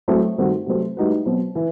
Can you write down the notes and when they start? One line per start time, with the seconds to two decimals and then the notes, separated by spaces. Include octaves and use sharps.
0.08 A2 F#3 A3 C4
0.37 G2 D#3 A3 C4 F#4
0.66 C3 F#3 A3 C4
0.97 A2 G3 D#4 F#4 B4
1.26 B2 F#3 C4
1.55 E3